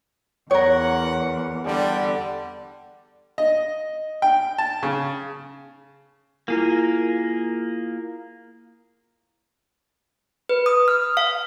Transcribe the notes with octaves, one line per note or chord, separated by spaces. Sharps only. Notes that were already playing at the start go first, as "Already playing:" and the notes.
E2 A#4 C#5 F#5
D3 G3
D#5
G5
A5
C#3
A#3 E4 F4 G#4 A#4
B4
D#6
F6
F5